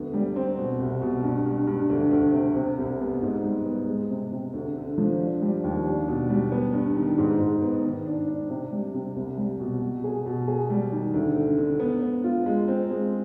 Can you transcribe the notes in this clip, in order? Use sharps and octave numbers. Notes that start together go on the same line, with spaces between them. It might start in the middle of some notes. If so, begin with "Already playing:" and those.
Already playing: D2 B3
G3
C4
B2
C2
B2
G2
G2
G2
D2
D2
C3
C3
C2
B3
G#2
G3
B3
G#3
C3
C3
D2
D3
F3
D4
G3
D#2
D4
B2
G3
B3
G2
D#3
G#2
G#2
B3
D#3
D4
D4
C3
G3
C3
C2
G3
B2
B2
G#4
B2
G#4
G3
D#3
D2
D3
D3
B3
B3
F4
G#3
C4
G#3